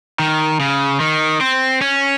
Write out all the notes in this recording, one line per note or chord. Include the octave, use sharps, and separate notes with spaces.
D#3
C#3
D#3
C4
C#4